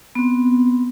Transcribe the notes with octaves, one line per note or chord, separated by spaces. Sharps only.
B3 C4